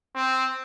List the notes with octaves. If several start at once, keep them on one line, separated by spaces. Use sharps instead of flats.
C4